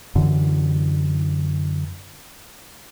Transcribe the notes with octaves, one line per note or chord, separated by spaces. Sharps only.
F#2 D3 E3